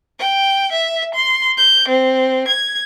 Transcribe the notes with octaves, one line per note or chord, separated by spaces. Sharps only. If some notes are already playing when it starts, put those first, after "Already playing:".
G5
E5
C6
G6
C4
G#6